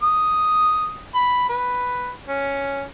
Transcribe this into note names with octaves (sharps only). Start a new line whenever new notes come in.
D#6
B5
B4
C#4